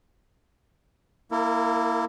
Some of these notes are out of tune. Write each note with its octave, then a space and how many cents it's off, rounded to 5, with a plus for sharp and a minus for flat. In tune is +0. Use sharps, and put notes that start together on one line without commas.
A#3 +0 E4 +0 A#4 -40